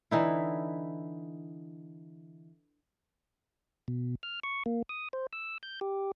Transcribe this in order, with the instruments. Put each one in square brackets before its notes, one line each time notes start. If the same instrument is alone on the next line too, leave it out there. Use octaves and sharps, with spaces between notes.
[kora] D3 E3 D#4 E4
[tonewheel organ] B2
F6
C#6
A#3
D#6
C5
E6
G6
G4